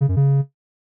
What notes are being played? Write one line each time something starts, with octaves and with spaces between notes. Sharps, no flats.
C#3
F#2
C#3